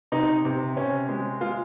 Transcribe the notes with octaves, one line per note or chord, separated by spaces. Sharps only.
C3 D#4
C3
C3 C#4
G#3
G#3 F4